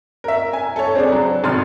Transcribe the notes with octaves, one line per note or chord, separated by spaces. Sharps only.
A#4 E5
G#5
A4 C#5
C4 D4 G#4 D5
F#3
G#1 B2 C6 F6